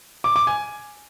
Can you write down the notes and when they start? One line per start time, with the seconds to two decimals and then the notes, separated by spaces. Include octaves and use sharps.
0.24 D6
0.36 D6
0.47 G#5